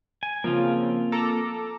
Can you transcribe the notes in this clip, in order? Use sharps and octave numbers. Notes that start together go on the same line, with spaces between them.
G#5
C#3 F3 A#3 C4 F4
A4 A#5 D6